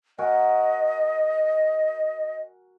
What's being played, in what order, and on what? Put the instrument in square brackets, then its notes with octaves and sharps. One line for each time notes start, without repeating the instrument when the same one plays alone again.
[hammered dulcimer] F#4 A#4 G#5 [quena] D#5